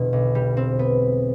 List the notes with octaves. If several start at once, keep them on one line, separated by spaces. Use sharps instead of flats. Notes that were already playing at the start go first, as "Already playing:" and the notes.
Already playing: E1 E2 B2 D3 G3
B1
G3
C4
B3